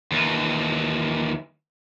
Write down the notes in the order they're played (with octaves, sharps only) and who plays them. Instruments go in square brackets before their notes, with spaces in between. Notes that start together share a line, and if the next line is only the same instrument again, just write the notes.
[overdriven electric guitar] D#2 E3